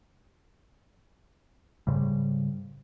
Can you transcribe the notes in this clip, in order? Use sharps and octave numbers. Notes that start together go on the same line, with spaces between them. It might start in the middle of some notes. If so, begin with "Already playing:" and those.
G#2 C#3 G3